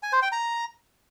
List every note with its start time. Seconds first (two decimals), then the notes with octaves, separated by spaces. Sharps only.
0.03 G#5
0.13 C5
0.22 G5
0.32 A#5